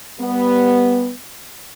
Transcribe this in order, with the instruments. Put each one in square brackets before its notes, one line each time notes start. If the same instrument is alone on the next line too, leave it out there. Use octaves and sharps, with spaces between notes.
[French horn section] G3 B3